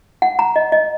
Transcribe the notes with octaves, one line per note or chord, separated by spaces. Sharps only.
F#5
A#5
D#5
D#5